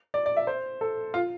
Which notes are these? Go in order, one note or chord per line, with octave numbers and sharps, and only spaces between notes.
D5
D5
E5
C5
A4
F4